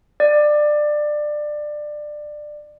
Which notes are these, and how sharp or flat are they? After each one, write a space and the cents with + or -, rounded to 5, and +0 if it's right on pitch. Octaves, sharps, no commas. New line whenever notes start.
D5 +20